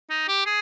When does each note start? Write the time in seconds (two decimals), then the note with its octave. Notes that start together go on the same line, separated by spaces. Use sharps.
0.10 D#4
0.28 G4
0.46 G#4